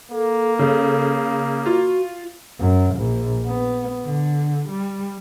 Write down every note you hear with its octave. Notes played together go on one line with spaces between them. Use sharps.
A#3 A4
C#3
F4 F#4
F#2
A#1
B3
D3
G3